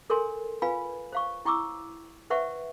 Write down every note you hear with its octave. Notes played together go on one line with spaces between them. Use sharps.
A4 A#4 C#5 G#5 C6
F4 B4 F5 G#5 B5
C5 F5 C#6
E4 G5 C#6 D6 E6
B4 C5 E5 F#5 G5 C#6